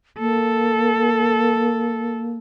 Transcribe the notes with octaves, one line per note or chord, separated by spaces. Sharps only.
A#3 A4